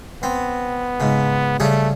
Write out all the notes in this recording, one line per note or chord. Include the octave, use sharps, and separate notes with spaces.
B3 C4
G#2 C#3
C#3 G3 A3 G#4